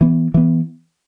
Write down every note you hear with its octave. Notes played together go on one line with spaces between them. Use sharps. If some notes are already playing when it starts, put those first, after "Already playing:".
E3 B3
E3 B3